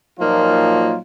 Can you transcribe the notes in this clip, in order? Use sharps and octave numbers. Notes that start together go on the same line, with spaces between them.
A#2 F3 F#3 A#3 D#4 F4